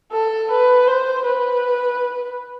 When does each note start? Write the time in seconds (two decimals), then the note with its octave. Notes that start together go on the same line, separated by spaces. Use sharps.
0.12 A4
0.51 B4
0.87 C5
1.25 B4